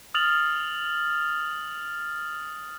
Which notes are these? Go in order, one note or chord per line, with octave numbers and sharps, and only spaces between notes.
D#6 F6 A6 F7 F#7